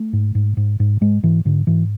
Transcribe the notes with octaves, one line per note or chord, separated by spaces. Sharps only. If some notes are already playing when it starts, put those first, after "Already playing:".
Already playing: A3
G#2
G#2
G#2
G#2
G#2 G#3
G#2 E3
G#2 D3
G#2 E3